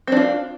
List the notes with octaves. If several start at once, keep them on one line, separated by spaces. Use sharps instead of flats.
C4 D4 F4